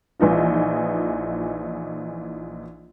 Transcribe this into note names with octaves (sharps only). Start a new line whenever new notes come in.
A#1 E3 D#4 F4